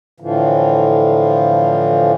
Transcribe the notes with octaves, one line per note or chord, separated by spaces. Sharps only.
A2 D3 E3 F3